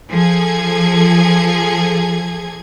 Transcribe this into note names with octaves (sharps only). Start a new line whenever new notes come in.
F3 G#4 A4 G#6